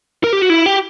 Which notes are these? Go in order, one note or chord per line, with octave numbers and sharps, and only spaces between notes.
A#4
G4
F#4
E4
G4